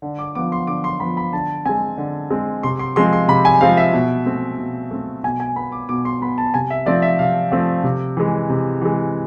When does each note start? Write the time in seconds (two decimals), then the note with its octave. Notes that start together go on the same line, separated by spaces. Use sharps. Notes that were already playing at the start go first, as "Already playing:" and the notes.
0.02 D3
0.19 D6
0.35 F3 B3 D6
0.52 C6
0.67 D3 D6
0.84 C6
1.00 F3 B3 B5
1.17 B5
1.33 D3 A5
1.65 G#3 C4 G#5
1.97 D3
2.30 G#3 C4
2.63 C3 C6
2.79 C6
2.96 F3 G#3 C4 C6
3.13 C6
3.28 C3 B5
3.45 G#5
3.61 F3 G#3 C4 F5
3.77 E5
3.93 B2
4.26 A3 C4
4.58 B2
4.91 A3 C4
5.23 B2 G#5
5.40 G#5
5.56 B3 B5
5.72 D6
5.89 B2 D6
6.05 C6
6.22 B3 B5
6.38 A5
6.54 C3 G#5
6.70 E5
6.86 F3 A3 C4 D5
7.02 E5
7.19 C3 F5
7.52 F3 A3 C4
7.84 C3
8.17 E3 G#3
8.50 C3
8.81 E3 G#3